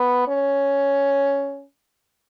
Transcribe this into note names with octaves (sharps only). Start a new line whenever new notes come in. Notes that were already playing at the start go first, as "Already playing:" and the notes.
Already playing: B3
C#4